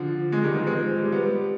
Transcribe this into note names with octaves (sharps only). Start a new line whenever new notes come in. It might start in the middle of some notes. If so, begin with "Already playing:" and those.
Already playing: D3 F3
G#3
D#3 G3
F3 G#3
G#3 C4
G3
G#3
G3 B3